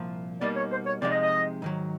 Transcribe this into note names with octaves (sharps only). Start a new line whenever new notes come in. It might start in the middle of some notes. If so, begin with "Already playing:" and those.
Already playing: C2 A#2 F3
B2 G3 A#3 D#4 D5
C#5
C5
C#5
C3 F3 G#3 B3 D#4 D5
D#5
D#5
G#2 D#3 F#3